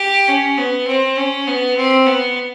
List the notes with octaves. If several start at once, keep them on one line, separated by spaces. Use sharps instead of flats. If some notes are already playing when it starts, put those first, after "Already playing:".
Already playing: G4
C#4
B3
C4
C#4
B3
C4
B3